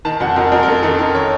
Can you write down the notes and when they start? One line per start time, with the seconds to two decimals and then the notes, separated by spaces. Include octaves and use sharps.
0.05 D#3 A5
0.20 F2 F#5
0.36 F2 A#4
0.52 F2 A#4
0.63 A#4
0.67 F#2 A4
0.83 D#3 A4
0.99 D#3 A#4
1.14 C#5